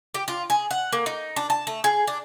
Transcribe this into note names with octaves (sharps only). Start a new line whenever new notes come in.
G4
F4
G#4
F#5
A#3
D#4
D4
A5
A3
G#4
D4